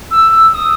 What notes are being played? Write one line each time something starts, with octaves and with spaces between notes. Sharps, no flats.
E6
E6
D#6